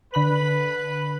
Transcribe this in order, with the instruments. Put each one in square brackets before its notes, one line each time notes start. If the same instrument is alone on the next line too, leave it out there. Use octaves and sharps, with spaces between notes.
[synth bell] D3 B5 F#7 [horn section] B4